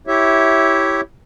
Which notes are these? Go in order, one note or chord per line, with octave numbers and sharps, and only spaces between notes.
E4 G4 C#5 E5